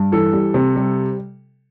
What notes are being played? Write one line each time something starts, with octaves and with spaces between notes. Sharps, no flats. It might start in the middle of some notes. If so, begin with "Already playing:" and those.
Already playing: G2
E3 A4
G3
C3
G3